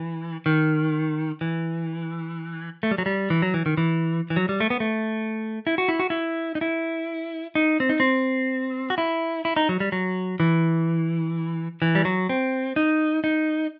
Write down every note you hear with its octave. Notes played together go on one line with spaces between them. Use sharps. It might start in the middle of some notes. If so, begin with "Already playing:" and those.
Already playing: E3
D#3
E3
A3
G3
F#3
G3
E3
F#3
E3
D#3
E3
E3
F#3
G3
A3
B3
A3
E4
F#4
E4
F#4
E4
D#4
E4
D#4
C4
D#4
C4
F#4
E4
E4
D#4
F#3
G3
F#3
E3
E3
G3
F#3
C4
D#4
D#4